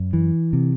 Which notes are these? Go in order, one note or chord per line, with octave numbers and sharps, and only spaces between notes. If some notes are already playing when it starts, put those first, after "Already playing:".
Already playing: F#2
E3
C3